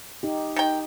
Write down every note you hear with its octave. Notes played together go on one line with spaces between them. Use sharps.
D#4 G4
D#3 G5